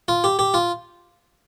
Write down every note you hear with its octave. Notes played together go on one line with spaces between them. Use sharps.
F4
G4
G4
F4